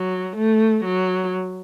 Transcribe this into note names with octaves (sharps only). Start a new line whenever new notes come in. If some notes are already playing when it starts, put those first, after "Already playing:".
Already playing: F#3
A3
F#3